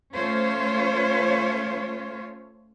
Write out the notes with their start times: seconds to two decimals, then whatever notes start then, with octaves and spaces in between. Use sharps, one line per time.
0.13 A3 C#4 F4 C5 C#5 F5